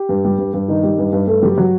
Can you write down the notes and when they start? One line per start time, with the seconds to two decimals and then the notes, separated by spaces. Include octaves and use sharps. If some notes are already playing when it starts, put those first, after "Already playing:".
Already playing: G4
0.09 G2
0.25 G3
0.38 G2
0.54 G2
0.68 D#3 D#4
0.83 G3
0.98 G2
1.13 G2
1.27 G2 A3 A4
1.43 F#3 G3 G4
1.58 F#3 F#4